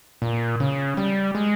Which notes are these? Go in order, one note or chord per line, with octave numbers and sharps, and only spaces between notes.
A#2
C#3
G3
G#3